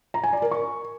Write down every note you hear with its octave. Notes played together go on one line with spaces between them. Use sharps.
A#5
G#5
D5
A#4
C#6